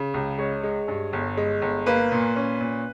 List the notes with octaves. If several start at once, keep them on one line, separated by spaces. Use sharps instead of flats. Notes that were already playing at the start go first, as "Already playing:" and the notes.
Already playing: C#3
C#2
G#3 C#5
G#3
G2
G1
G#3
G1
A#3 B4
A#2
C#4
A#2